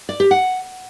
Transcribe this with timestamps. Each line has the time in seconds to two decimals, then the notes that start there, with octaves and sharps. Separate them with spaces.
0.09 D5
0.20 G4
0.31 F#5